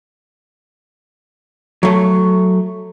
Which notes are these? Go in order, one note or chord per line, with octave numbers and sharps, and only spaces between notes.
F#3 A3